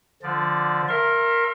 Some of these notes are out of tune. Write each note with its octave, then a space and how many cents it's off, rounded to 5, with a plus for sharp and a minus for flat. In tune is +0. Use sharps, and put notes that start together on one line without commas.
D3 +0 F3 +0 D5 +0
A#4 +0 E5 +35 C6 +35